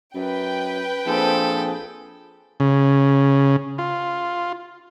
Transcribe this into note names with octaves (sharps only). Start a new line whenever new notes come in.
F#2 B4 G5
A#1 F3 C4 G#4 A4
C#3
F4